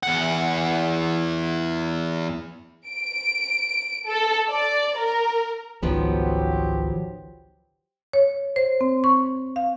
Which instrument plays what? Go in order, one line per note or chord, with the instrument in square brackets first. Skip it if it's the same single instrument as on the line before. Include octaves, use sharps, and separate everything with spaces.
[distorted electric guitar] E2 F#5
[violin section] D7
A4
D5
A#4
[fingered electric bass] G#1 C#2 [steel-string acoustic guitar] D#3 F3 B3 [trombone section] F#3 G4 C5
[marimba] C#5
C5
C4
C#6
F5